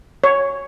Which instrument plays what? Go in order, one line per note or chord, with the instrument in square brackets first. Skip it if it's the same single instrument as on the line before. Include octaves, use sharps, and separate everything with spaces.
[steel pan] C#5